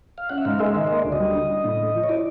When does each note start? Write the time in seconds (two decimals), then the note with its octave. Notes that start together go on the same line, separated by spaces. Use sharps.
0.18 F5
0.30 C#4 F#5
0.38 E5
0.45 G#2 F5
0.59 G#3 E5
0.75 D#3 E5
0.87 A#3 D#5
0.99 D5
1.04 D2
1.12 D#5
1.20 G3
1.35 D3
1.50 D4
1.64 A2
1.80 A3
1.95 F3
2.03 C#5
2.09 E4 D5